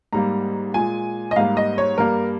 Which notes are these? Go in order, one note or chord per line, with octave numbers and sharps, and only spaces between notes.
G#2 G3 A#3 A#5
A#2 G#3 G#5
D#5
G#2 G3 A#3 F5
D#5
C#5
G2 G3 A#3 A#4